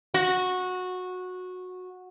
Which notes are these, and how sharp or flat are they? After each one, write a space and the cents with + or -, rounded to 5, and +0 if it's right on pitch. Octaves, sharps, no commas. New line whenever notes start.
F#4 -15